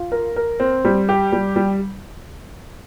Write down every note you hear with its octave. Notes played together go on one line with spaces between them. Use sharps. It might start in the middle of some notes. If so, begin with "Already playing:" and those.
Already playing: F4
A#4
A#4
C4
G3
G4
G3
G3